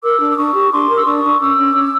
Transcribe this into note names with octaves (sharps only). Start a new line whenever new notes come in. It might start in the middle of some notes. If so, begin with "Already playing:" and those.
A#4 D6 E6
D4
D6
D4 C#6 D#6
G4
D4 C6 D6
A#4
E6
D4 C#6 D#6
D4
C#4 D6 E6
C#4
C#4